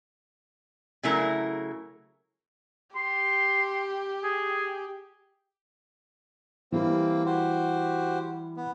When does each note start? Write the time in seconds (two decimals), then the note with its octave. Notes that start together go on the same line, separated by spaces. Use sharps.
1.03 C#3 F#3 A3 E4 A#4
2.96 G4 C6
4.24 G#4
6.72 E3 G3 A#3 C4
7.26 F#4 G4 C5
8.56 B3